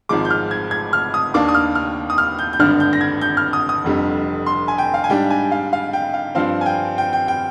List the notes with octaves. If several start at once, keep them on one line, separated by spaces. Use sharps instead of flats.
G#1 G#2 F3 G#3 D6
G6
F6
G#6
G#6
F6
D#6
D#2 D#3 A#3 D4 D6
D#6
F6
F6
D#6
F6
G6
G6
G#1 G2 D3 F6
G6
A#6
G#6
G6
F6
D#6
D#6
F1 F2 D3 G3
C6
G#5
G5
F5
G#5
G#2 G3 D4 G5
G#5
F5
F5
G5
F5
G2 F3 C4 F5
G#5
G5
G5
G5
G5